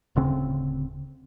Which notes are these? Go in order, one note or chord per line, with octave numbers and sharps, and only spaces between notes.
D1 D2 C#3 C4